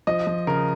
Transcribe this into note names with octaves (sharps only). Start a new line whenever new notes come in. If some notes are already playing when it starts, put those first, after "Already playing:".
F3 D#5
F3
C#3 A#4